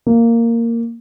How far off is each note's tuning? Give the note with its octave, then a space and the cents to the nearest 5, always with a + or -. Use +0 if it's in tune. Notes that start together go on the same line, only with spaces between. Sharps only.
A#3 -10